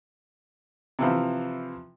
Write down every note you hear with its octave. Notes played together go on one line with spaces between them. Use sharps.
C3 E3 F3